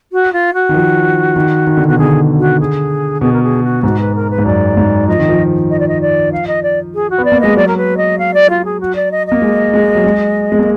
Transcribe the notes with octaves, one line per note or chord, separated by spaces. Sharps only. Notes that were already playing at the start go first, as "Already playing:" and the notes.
F#4
F4
F#4
D#3
F3
D#3
D#3
D3
B2 F#4
D3 G#4
F#4
G#4
B2 G#4
A#4
G#4
F#4
G#2 F#4
B4
A#4
B4
G#2
F#2 D5
G#2
F3 D#5
D#3
F3
D#5
D5
D#5
D5
F5
D#5
D5
G#4
F#4
B3
D5
A#3
G#3 D#5
F#3 D5
A#4
B4
D#5
F5
D5
F4
G#4
F#4
D5
D#5
D#5
A#3
G#3
G#3
F#3
G#3
G#3
A#3